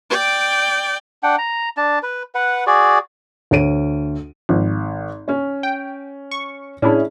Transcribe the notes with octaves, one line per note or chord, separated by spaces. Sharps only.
D5 G5
D4 F#5 G5
A#5
D4 A5
B4
B4 F#5
F#4 G#4 D5
D2 C#5 D7 D#7
G#1 F3
C#4 C#5
G5
C#6
A2 C#4 D4 E4 G#4